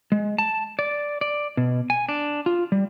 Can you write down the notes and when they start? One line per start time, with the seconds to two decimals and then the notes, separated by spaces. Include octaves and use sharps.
0.12 G#3
0.38 A5
0.79 D5
1.21 D5
1.57 B2
1.90 G#5
2.09 D4
2.46 F4
2.72 G3